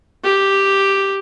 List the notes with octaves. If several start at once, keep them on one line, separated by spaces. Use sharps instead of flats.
G4